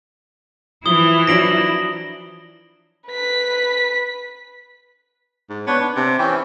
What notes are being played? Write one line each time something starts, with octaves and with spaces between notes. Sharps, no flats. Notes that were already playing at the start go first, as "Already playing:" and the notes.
E3 F3 E4 D#6 G7
F3 F#3 D4 A#6 D7 F#7
B4 B6
G#2
B3 D4 B4 C#5
D4
C3 D4
E3 C4 C#4 G5